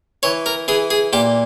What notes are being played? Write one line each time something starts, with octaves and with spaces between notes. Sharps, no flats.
E3 C#5
A#4
E3 G#4
G#4
A#2 G4